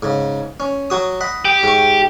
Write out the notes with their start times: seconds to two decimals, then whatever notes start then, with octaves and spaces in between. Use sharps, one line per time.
0.02 G#2 C#3
0.60 C#4
0.90 F#3 F#4 D#6
1.21 D#5 F#5 B5
1.45 G4
1.63 G#2 C#6